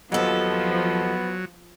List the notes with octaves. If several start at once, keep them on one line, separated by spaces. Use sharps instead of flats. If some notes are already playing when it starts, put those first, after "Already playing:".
D#2 F3 F#3 B3 A4